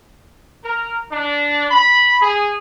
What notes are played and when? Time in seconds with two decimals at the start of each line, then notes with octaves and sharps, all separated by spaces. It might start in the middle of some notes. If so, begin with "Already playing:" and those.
0.64 A#4
1.11 D4
1.71 B5
2.21 G#4